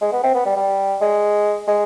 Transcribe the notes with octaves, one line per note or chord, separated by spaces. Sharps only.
G#3
B3
C4
B3
G3
G3
G#3
G#3